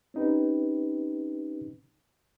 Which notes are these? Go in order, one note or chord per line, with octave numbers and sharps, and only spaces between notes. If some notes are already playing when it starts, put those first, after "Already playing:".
C4 C#4 D#4 G4 B4